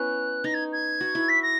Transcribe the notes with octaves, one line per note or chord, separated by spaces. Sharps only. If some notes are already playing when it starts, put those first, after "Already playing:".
Already playing: B3 C#4 E4 F#6
D#4 A#6
G#6
G#6
F#4
E4
B6
A#6